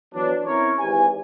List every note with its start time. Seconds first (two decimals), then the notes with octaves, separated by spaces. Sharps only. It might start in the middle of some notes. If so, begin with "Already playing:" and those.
0.14 E3 F#3 B3 D4
0.44 C4 C#4 E4 A#4 C#5
0.79 G#1 E3 G4 G#5